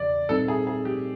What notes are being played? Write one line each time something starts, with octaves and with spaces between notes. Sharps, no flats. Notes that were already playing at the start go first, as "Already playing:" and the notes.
Already playing: E2 C#3 E3 D5
A#2 G3 C4 D#4 A4
G#4
G#4
G4